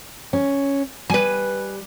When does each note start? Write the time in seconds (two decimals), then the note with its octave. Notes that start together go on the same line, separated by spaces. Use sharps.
0.33 C#4
1.10 G3 B4 G#5